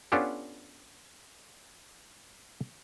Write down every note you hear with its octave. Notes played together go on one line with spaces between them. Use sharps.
B3 C#4 D4 F4 G4 A4